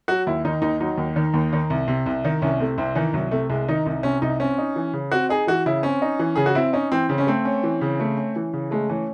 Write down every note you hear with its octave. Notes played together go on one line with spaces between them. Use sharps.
F#3 F#4
D#2 E4
D#3 D#4
D#2 D#4
F#3 D#4
D#2
D#3
D#2
D#3
C2
C3
C2
D#3
C2 C#4
C3 A3
C2 C4
D#3 E3
C2 F#3
C3 A3
C2 G#3
D#3 D#4
C2 D#4
C3 C#4
C2 D#4
C4 C#4
D#4
E3
C#3
C4 F#4
D#4 G#4
E3 F#4
C#3 E4
C4 C#4
D#4
E3
C#3 G#4
F#4
C4 E4
C#4 D#4
E3 C4
C#3 C4
C#4
A3 C4
C#4
E3
C#3
A3
C#4
E3
C#3
G#3 A3
E3 C#4